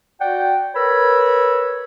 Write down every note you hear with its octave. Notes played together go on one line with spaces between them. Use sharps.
F#4 D5 F#5 G5
A#4 B4 C#5 B5 E6